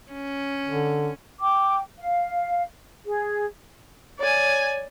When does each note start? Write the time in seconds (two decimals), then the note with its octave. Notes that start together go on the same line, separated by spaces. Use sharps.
0.12 C#4
0.68 D3
1.40 G5 D6
1.98 F5
3.04 G#4
4.19 C#5 D5 G#5